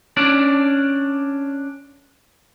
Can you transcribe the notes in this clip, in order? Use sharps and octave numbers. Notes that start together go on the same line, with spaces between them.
C#4 D4 D5